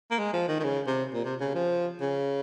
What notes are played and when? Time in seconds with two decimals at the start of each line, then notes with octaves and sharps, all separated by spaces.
0.11 A#3
0.19 G#3
0.33 F3
0.48 D#3
0.60 D#3
0.64 C#3
0.87 C3
1.14 A#2
1.25 C3
1.40 C#3
1.55 F3
2.01 C#3